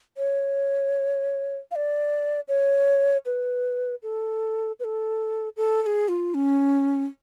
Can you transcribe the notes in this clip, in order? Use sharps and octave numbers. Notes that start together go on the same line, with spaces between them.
C#5
F5
D5
C#5
B4
A4
B4
A4
A4
A4
G#4
F4
C#4